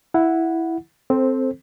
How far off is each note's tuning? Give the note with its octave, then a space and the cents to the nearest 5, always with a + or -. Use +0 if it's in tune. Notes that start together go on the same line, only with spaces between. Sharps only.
E4 +0 F#5 -10
C4 +0 A4 +0 C5 +15